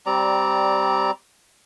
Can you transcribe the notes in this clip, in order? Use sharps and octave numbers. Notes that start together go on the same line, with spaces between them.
G3 C4 D5 A#5